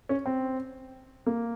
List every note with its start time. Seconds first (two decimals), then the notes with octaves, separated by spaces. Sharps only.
0.09 C#4
0.26 C4
1.26 A#3